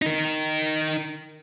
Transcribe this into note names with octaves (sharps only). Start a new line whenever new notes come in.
D#4 A#4